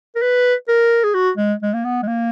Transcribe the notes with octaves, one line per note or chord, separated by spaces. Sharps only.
A#4
B4
A#4
G#4
F#4
G#3
G#3
A#3
B3
G#3
A#3